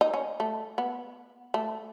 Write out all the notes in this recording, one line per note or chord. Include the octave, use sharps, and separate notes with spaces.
D#4
C#4
A3
B3
A3